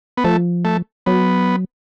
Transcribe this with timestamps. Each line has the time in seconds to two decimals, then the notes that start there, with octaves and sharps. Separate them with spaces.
0.17 B3
0.24 F3 A3
0.65 A3
1.06 F#3 B3